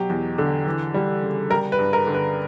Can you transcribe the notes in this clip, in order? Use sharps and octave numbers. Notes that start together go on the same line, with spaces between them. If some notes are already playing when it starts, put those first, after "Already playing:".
Already playing: B2 F#3 G4
E2
D3
E3
G3
C#3
G3 A#4
B4
G2
A#4
D3
B4